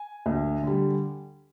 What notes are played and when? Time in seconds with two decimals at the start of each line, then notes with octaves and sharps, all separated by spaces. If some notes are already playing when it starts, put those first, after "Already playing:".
Already playing: G#5
0.26 D2
0.63 D3 G3